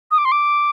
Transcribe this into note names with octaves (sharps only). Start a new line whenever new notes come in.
D#6
D6
C6
D6